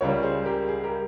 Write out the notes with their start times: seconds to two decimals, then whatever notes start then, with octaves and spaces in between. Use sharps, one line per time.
0.01 C#2 C#3 G3 A#4 C#5
0.23 G#4 C5
0.45 G4 A#4
0.68 G#4
0.83 G4 A#4